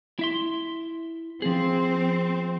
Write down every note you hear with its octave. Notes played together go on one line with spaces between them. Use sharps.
E4 E5 C6
F3 C4 G#4